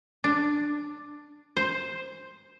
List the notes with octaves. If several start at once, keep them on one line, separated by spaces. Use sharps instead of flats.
D4
C5